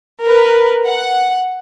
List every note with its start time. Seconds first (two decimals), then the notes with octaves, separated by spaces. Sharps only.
0.23 A#4 B4
0.87 F#5